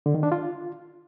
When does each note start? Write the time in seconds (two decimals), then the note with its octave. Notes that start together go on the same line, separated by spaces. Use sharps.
0.06 D3
0.14 D#3
0.23 D4
0.32 F4